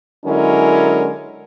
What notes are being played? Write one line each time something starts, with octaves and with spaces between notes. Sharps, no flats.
D3 F#3 G#3 C#4 E4 A#4